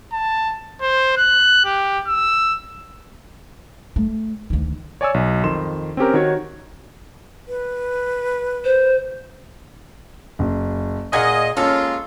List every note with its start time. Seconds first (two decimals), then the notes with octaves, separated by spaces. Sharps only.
0.13 A5
0.82 C5
1.17 F#6
1.65 G4
2.07 E6
3.96 A3
4.50 D2 D#3
5.01 C#5 D5 G#5 C#6 E6
5.14 B1
5.44 F2 D#3 C6 E7
5.97 C4 C#4 G4 A#4
6.14 D#3 F#4 C#5 G#6
7.48 B4
8.65 C5
10.39 F#1
11.13 A#2 G#4 D#5 F5 F#5 G#5 G#6
11.57 G#3 A#3 C#4 F4 A4